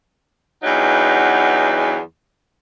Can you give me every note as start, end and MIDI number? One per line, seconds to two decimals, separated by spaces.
0.63 1.96 40
0.63 1.96 43
0.63 1.96 54
0.63 1.96 63